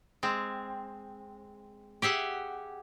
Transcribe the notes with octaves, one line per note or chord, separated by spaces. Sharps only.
G#3 C4
G4 G#4 E5 F#5